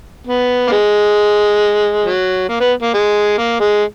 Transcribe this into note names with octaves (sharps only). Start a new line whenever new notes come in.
B3
A#3
G#3
F#3
A#3
B3
A#3
G#3
A#3
G#3